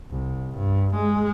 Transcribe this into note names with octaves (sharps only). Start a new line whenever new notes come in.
C2
G2
G#3